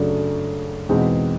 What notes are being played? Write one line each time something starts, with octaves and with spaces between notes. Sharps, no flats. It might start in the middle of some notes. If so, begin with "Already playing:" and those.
Already playing: F#2 C#3 F#3 A3 D4
E2 B2 G#3 C4 D#4